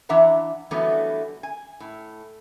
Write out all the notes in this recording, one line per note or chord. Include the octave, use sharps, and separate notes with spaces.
E3 D4 E5 F#5 A#5
D3 E3 F#3 G3 A3 B3
G#5
A2